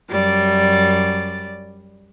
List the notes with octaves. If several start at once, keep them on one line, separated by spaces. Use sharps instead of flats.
F#2 G3 D5 A6